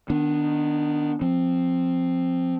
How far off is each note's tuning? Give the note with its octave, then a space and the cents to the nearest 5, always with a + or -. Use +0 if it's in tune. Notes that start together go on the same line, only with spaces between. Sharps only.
D#3 -20 B3 +5 D4 +0
F3 +0 C4 +0